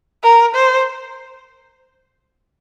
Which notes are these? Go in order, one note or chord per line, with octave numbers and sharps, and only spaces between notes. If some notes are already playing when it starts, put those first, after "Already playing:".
A#4
C5